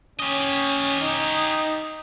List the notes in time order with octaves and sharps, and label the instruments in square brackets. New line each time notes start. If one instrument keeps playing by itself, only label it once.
[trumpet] C#4 [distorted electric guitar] G4 D#5
[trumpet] D#4